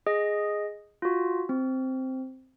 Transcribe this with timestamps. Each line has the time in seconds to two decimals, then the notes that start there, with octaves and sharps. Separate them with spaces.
0.06 G#4 D#5
1.02 F4 F#4
1.49 C4